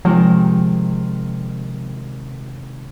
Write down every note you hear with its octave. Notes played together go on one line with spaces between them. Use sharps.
C3 D#3 F3 G#3